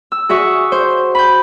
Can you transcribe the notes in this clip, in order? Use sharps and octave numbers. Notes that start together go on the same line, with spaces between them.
E6
F#4 G#4 E5 C#6
C5
B5 G6